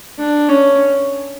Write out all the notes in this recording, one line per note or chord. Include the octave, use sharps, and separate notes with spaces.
D4
C#4